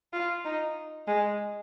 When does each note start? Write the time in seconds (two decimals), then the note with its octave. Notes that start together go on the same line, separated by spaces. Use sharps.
0.13 F4
0.45 D#4
1.07 G#3